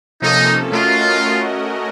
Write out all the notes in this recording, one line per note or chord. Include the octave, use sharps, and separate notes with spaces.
C3 F3 A#3 C#4 D#4 A4
A3 C#4 F4 F#4 A#4 D#5